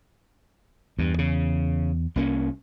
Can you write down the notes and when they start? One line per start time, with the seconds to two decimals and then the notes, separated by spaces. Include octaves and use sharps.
0.99 E2 G2
1.18 C#3
2.16 C2 A#3 C#4